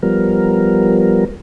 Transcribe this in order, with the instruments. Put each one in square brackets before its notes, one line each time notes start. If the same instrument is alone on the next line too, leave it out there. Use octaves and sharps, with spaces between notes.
[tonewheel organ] F3 G3 B3 A#4